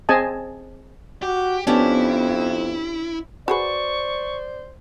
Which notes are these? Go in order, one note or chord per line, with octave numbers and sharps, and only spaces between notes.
C4 G#4 D#5 G#5 A5
F#4 G4
F2 B3 C#4 D4 E4 G4
F#4 G#4 B4 C5 D5 C#6